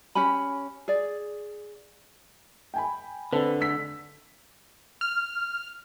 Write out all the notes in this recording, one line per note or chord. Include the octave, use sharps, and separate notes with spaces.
C#4 G4 G#5 B5
G#4 D5
G5 G#5 B5
D3 C4 A4 B4
E6 B6
F6